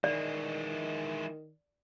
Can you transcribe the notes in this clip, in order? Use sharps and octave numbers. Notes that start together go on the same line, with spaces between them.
D#3 E3 G#3 D5